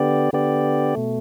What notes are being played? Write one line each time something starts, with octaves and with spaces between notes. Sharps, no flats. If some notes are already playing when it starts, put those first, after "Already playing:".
Already playing: D3 B3 G4 D5
D3 B3 G4 D5
B2 A3